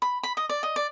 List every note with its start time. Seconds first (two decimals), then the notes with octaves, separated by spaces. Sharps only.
0.02 B5
0.23 B5
0.37 D#5
0.49 D5
0.63 D#5
0.76 D5